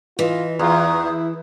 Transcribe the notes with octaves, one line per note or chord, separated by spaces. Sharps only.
E3 F4 D#5
E2 F4 D#6
E4